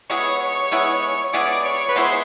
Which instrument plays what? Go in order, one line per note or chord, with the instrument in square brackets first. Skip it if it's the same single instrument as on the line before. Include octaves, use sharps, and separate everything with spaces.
[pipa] G#3 B3 E4 G#4 [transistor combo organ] C#5
[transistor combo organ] C#5
[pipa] G#3 B3 E4 G#4
[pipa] G#3 B3 E4 G#4 [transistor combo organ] D5
[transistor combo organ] C#5
B4
[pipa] G#3 B3 E4 G#4 [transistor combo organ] C5